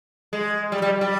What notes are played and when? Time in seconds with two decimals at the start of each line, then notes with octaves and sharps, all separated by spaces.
0.33 G#3
0.72 G3
0.82 G3
1.01 G3